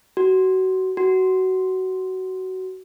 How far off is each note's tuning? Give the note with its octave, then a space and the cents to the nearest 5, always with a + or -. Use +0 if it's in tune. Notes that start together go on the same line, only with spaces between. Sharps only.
F#4 +25
F#4 +20